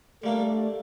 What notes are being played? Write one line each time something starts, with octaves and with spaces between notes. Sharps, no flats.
G3 A3 A#3 D4